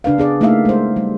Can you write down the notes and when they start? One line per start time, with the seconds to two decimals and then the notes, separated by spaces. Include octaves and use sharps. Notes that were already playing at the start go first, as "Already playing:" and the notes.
0.04 C#3 D4 B4 F5
0.18 B3 G#4 D5
0.41 A3 A#3 D#4 E4 E5 F5
0.65 G#3 C5
0.96 G3